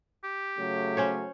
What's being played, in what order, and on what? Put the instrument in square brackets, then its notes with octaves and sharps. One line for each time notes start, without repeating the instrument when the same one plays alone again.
[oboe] G4
[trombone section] C#3 F#3 A3
[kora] C#4 C5 C#5